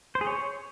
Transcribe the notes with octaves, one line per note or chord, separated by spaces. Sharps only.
C5
G#4
C#5